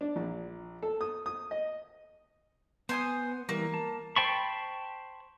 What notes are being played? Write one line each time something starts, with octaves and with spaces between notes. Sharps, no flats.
D4
A#1
A4
D#6
D#6
D#5
B3 C5 G#5 D#6
E3 G3 A#3
A5
C5 G5 A5 B5 C#6